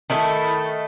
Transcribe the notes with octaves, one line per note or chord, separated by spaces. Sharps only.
D#3 A3 E4